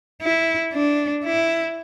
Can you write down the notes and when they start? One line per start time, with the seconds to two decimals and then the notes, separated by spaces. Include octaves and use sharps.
0.22 E4
0.73 D4
1.25 E4